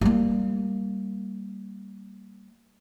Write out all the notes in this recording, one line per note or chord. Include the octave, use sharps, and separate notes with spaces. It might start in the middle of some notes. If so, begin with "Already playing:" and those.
G3 A#3